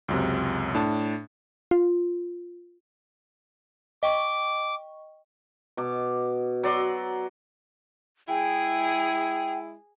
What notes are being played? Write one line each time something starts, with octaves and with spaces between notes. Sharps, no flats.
C#2 F#2 C3
A2 D4 A5
F4
D#5 G5 C#6 D6
B2 D6
F#3 D5 C6
G#3 E4 G#4 G5